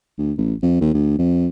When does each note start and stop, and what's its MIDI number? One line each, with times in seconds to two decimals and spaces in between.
0.18 0.32 38
0.38 0.54 33
0.62 0.80 41
0.81 0.93 39
0.94 1.17 38
1.18 1.48 41